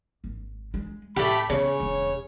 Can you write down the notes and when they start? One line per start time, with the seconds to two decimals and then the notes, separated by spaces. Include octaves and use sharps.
0.24 G#1
0.74 G#3
1.16 A2 A3 G4 B5
1.50 C#3 B3 C#4 C#5
1.80 E1 A3